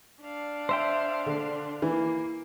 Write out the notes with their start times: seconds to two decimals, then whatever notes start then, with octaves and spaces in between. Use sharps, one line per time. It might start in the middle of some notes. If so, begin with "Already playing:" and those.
0.22 D4 F5
0.69 C5 E5 G5
1.26 D3
1.82 E3 A#3